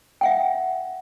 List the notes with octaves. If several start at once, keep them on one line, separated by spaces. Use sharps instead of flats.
E5 F#5 G5